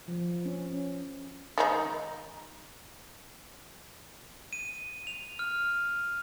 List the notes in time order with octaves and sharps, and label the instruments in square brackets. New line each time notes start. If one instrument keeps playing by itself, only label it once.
[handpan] F3
C#4
[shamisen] D#3 G#3 D#4
[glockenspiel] D#7
F7
F6